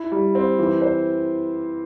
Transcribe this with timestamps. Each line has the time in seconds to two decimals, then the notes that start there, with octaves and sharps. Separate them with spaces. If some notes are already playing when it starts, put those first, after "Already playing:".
Already playing: E4
0.12 G3
0.35 C4
0.59 E3
0.82 C5